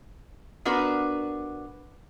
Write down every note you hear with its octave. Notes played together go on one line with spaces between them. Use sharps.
B3 D4 F#4 A#4 B4